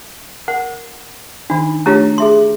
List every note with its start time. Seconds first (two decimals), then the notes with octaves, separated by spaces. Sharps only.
0.48 A#4 F#5
1.50 D#3 D4 D#4
1.86 A3 D4 F4 G4 C#5 A#5
2.18 G#4 E5 C6